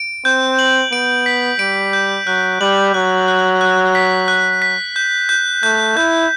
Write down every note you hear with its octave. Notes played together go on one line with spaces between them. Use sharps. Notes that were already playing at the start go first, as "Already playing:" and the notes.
Already playing: D7
C4 G6
F#7
B3 D7
B6
G3 D7
G6
F#3 F#6
G3 F#7
F#3 F#6
F#6
F#6
B6
F#6
B6
G6
G6
A3 G6
E4 G6